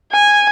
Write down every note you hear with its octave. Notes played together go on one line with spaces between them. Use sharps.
G#5